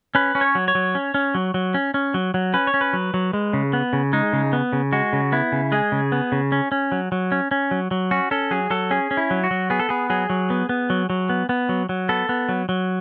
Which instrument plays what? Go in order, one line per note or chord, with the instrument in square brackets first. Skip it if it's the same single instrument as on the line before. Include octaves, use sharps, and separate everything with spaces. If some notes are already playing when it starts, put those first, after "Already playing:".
[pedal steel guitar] C#4 B4
C#4
C#5
F#3
C#5
F#3
C#4
C#4
F#3
F#3
C#4
C#4
F#3
F#3
C#4 B4
C#5
C#4
B4
F#3
F#3
G#3
C#3
B3
C#3
G#3 D#4
C#3
B3
C#3
G#3 F#4
C#3
B3 E4
C#3
G#3 G#4
C#3
B3
C#3
C#4
C#4
F#3
F#3
C#4
C#4
F#3
F#3
C#4 F#4
C#4 A4
F#3 G#4
F#3 A4
C#4 G#4
C#4
E4
F#3
F#4
F#3
B3 G#4
A4
B3 G#4
F#3 G#4
F#3
B3
B3
F#3
F#3
B3
B3
F#3
F#3
B3 A4
B3
F#3
F#3